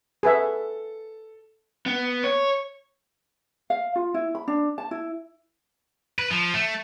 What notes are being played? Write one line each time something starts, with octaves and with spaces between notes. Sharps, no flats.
G#4 A4 B4 E5
B3
C#5
F5
F4
E4
B5
D4
A5
E4
B4
F3
A3